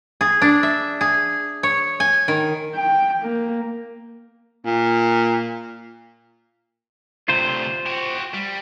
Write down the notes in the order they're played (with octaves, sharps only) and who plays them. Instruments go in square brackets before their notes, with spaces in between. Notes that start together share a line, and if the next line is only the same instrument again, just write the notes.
[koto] G#4
D4
E5
G#4
C#5
G#5
D#3
[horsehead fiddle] G5
A#3
[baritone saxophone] A#2
[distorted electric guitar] D2 C3 [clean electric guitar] F4 C5
[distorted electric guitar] F#4 G4
G3